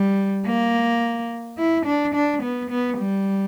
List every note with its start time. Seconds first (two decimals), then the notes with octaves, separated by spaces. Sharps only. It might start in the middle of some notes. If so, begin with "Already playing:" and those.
Already playing: G3
0.46 A#3
1.58 E4
1.86 D4
2.15 D4
2.42 B3
2.70 B3
2.98 G3